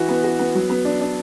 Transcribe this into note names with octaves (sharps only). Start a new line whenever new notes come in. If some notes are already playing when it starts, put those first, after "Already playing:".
Already playing: E3 F#4
B3
F#4
B3
F#3
B3
D4
D4